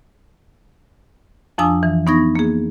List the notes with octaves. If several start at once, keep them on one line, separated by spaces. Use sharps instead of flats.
F2 F3 D4 G#5 D#6 E6
E3
B3 D#4 C#6 G#6 A#6
A#3 G#4